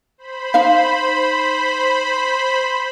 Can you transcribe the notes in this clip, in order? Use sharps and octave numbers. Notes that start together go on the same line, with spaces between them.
C5 B5
D#4 F5